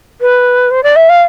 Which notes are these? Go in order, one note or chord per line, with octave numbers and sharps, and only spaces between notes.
B4
C5
D5
E5
F5